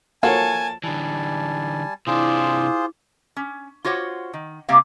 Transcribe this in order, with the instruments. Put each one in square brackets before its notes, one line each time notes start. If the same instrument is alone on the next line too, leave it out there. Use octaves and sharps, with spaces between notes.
[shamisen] F3 F4 F#4 [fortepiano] A#3 A4 C#5 [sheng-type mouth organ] G#5 [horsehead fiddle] A5
[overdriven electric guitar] D3 E3 [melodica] G3 G#5 A5
[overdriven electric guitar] C3 D4 [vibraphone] E4 D6 [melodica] F4 G#4 C5
[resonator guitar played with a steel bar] C#4
F4 F#4 C5 C#5 F#5
D#3
C3 G3 A#3 G4 F5